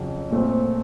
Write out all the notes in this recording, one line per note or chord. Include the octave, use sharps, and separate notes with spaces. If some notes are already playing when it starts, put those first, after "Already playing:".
Already playing: F2 C#3 F#3
A#2 A3 C4